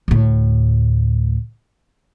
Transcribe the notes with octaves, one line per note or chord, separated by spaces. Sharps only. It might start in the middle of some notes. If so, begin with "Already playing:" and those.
D2 A2